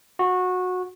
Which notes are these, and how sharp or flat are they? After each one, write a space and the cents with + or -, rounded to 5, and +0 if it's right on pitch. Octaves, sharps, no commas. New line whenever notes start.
F#4 -20